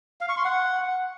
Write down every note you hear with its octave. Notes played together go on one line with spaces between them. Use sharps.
F5
C#6
C6
F#5